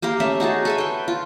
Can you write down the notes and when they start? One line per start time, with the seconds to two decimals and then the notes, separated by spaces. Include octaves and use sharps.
0.02 A#3 G4 A#4 F5
0.20 A3 C#4 E5
0.40 D#4 F#4 G#4 A5
0.65 A4 E5 G#5
0.78 B4 G5
1.08 F4